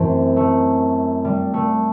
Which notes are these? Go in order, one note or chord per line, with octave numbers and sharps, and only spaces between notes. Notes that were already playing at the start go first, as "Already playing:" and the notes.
Already playing: F#2 E3 A3 C4
A3
G3
A3